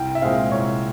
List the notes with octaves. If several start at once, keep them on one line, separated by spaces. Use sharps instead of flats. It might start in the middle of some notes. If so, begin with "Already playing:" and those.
Already playing: C2 G5
E5
A#2 G#3 C4 F5
C2 C#5